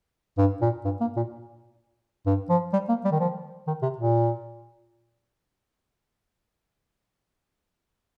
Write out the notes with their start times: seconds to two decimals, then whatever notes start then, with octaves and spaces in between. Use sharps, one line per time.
0.38 G2
0.61 A#2
0.85 G2
1.01 A#3
1.17 A#2
2.26 G2
2.50 F3
2.73 G3
2.89 A#3
3.05 G3
3.12 D#3
3.20 F3
3.67 D#3
3.83 C3
3.98 A#2